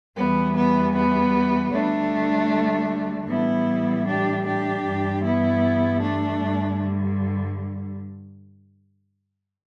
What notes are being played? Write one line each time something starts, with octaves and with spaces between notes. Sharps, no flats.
E2 E3 G3 B3
B3
B3
D2 D3 G3 A3 D4
A2 E3 G3 B3 E4
D4 G4
D4 G4
G2 E3 G3
B3 E4
A3 D4
G2 D3 G3